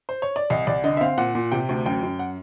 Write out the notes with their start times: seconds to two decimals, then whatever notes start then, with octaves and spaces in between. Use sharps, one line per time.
0.09 C5
0.22 C#5
0.36 D5
0.50 C2 D#5
0.67 C2 D5
0.84 D3 D#5
0.97 E5
1.01 C4 F5
1.18 A#2 F#5
1.35 A#2
1.52 C3 G5
1.69 D2
1.86 F#2 G5
2.03 F#2
2.19 F#5